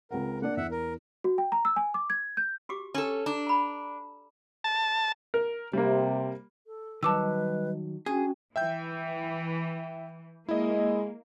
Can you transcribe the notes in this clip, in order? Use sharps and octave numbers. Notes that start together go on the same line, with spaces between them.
C#2 C4 A#4 F#5
A#3 D4 D5 F#5
E2 E5 F#5
A#4
F#4
G5
A#5
E6
G#5
D6
G#6
G6
F#4 G4 D6
C#4 A4
D4 A#5
A#5 B5
A5
A#4
C3 G3 A#3
A4
D#3 F#3 G3 B4 D#5 A5 D6 E6
C#4 D4 F#4 G#4 G5
E3 E5 G5 G6
G#3 A#3 E4 D#5